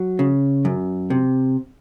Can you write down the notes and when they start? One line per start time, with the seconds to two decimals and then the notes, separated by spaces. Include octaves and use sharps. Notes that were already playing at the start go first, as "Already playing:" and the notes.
Already playing: F#3
0.19 C#3
0.65 F#2
1.10 C3